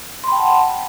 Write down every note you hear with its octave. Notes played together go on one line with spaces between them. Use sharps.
F#5 G5 A5 B5 C6